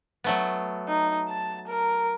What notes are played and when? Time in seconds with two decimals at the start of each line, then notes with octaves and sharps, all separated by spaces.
0.24 F#3 A3 B3
0.88 D#4
1.29 A5
1.68 A#4